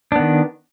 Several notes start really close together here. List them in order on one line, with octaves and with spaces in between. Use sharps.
D4 B3 D#3